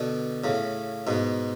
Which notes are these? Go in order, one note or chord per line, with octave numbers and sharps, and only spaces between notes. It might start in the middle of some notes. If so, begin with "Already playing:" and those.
Already playing: B2 D3
A2 C#3
G#2 B2